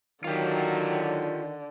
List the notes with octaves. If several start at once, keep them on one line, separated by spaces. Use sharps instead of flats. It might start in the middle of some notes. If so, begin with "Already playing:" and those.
D3 D#3 F#3 F4 G4